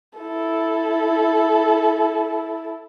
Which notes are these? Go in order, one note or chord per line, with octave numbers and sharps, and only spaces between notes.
E4 A4